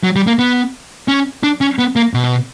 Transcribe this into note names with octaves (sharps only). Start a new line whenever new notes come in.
F#3
G3
A#3
B3
C#4
D4
C#4
B3
A#3
B2